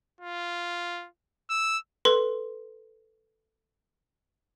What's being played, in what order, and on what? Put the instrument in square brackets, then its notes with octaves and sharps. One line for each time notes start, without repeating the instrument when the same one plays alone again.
[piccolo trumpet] F4
E6
[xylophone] A4 B4 C6